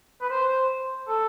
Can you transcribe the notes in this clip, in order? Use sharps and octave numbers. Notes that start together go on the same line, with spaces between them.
B4
C5
A4